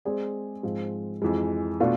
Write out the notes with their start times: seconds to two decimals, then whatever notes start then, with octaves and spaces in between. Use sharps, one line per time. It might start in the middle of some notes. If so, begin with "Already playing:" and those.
0.05 G#3 C4 G#4 D5
0.63 G#2 F3 G#3 C4
1.22 F2 E3 G#3
1.80 B2 A3 D4 F4